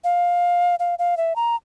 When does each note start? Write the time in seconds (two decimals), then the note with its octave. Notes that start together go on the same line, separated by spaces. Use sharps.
0.04 F5
0.79 F5
0.99 F5
1.17 E5
1.36 A#5